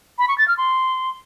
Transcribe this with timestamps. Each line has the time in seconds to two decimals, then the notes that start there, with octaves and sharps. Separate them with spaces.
0.19 B5
0.28 C#6
0.38 A6
0.48 F6
0.58 C6